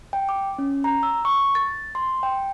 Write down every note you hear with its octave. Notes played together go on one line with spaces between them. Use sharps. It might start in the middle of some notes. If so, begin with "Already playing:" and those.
G5
D6
C#4
A#5
E6
C#6
A6
C6
G5